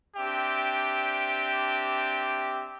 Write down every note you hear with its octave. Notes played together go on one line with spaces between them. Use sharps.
C4 D4 G4 E5 G5